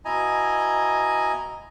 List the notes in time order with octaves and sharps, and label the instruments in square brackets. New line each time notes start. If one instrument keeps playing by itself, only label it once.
[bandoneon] B2 E4 D#5 G#5 A#5